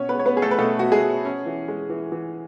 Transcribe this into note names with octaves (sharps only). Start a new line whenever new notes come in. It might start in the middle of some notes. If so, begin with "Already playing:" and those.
Already playing: B2 C#4 C#5
B3 B4
G#3 C#5
B3 B4
G#3 G#4
A3 A4
B4
B2 A3 A4
B2 F#4
G#3 G#4
G#3
C#4
E3
G#3
E3
E3